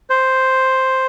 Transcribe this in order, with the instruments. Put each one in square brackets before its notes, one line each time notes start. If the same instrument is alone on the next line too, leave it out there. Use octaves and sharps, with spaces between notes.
[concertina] C5